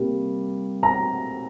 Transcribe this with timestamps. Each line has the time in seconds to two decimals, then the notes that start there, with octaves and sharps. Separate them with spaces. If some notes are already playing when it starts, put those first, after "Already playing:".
Already playing: C3 G3 A#3
0.83 A#5